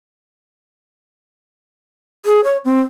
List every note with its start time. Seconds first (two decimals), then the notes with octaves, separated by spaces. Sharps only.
2.26 G#4
2.44 C#5
2.65 C4